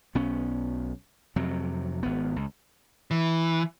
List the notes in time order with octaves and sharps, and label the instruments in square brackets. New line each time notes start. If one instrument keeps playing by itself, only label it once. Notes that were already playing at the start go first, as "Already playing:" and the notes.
[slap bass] B1 B3 C#4
F2 C3 F#3
G#1 B3
C#2
[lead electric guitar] E3